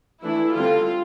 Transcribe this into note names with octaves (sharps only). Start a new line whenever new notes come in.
E3 A3 D4 E4
D3 G3 C4 F4